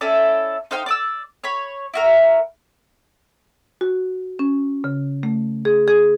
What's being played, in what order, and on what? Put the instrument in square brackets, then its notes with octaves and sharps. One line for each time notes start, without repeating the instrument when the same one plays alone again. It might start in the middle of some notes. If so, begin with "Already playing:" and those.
[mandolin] C#4 E4 A4 D5
D#4 C5 F5 G5
D5 D6 E6
C#5 B5
E4 F#4 A#4
[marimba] F#4
C#4
C#3
A3
G#4
G#4